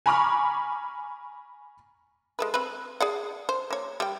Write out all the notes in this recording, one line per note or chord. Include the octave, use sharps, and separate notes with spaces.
G#5 A#5 B5 C#6 D6 F6
G#3 A4 B4
C4 B4
G#4 D5 F#5
C5
A#3 C#5
G3 G5